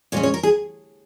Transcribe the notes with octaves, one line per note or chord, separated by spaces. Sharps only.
A#2 G#3 C#4 C#5
C#5
A#4
G#4